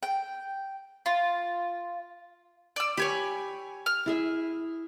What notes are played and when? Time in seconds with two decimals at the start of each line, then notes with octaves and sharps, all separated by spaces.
0.03 G5
1.06 F4
2.76 D5 E6
2.97 G4 C#5 G#5 B5
3.86 F6
4.06 E4 G#4 E5